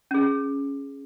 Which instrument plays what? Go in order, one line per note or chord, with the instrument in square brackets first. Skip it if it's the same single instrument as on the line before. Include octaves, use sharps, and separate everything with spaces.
[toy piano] C#4 G#4